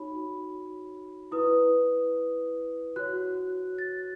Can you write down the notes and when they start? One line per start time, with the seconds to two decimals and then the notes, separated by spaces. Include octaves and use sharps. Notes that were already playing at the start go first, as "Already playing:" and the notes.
Already playing: D#4 F#4 C#5 B5
1.32 E4 B4 D#6
2.96 F#4 C#5 F#6
3.78 A6